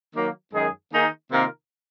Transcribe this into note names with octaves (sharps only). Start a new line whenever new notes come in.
D#3 F#3 A#3
F#2 D#3 G#3 D#4 G#4
D#3 A#3 D#4 G#4
C3 D#3 A#3 F4 A#4